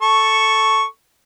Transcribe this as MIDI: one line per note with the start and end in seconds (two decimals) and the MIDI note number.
0.02 0.84 69
0.02 0.84 85